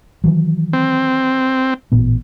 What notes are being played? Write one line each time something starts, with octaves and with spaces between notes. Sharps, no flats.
D#3 E3 F#3
C4
A1 A#2 B3